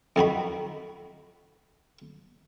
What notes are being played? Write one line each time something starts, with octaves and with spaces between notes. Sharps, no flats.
F2 D#3 F#4 B5